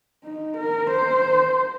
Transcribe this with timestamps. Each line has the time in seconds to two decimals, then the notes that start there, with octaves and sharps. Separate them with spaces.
0.24 D#4
0.57 A#4
0.91 C5